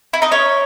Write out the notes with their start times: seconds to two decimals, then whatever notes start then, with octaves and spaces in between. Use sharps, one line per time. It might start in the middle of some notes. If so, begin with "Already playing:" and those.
0.13 E4
0.22 D#4 D#5
0.32 C#4 C#5